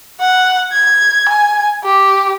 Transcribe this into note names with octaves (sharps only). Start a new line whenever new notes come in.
F#5
G#6
G#5
G4